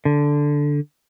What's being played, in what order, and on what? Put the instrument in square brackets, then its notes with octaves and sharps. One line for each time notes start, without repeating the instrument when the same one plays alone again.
[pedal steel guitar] D3